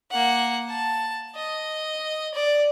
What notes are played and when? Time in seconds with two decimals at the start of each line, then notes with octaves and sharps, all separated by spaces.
0.11 A#3 F#5
0.69 A5
1.36 D#5
2.34 D5